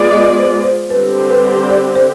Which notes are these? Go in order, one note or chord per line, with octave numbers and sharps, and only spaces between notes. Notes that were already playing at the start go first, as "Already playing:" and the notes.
Already playing: G#3 B3 F4 G#4 D5
D#5
C5
C5
D3 G3 C4 G4 B4
B4
D5
C5